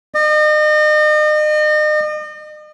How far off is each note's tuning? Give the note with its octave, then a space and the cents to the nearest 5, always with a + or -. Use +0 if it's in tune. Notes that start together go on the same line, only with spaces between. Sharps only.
D#5 -40